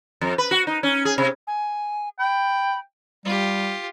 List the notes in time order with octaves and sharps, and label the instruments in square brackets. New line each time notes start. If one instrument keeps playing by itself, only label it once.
[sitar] F2
B4
F#4
D#4
C#4
G#4
C3
[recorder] G#5
[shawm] G5 [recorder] B5
[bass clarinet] G3 [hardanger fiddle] F4 G4